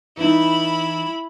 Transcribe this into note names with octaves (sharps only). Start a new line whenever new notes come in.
E3 D#4 E4 B5